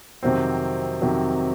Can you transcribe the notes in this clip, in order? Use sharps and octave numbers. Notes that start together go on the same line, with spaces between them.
F2 C3 D#3 F#3 C4
F2 C3 D#3 F#3